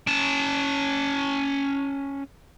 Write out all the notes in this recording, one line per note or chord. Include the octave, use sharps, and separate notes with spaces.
C#4 A5